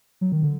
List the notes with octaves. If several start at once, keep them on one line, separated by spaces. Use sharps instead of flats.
F#3
D#3
D3